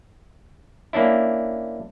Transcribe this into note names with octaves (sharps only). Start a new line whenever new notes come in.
A#3 C#4 D4 E4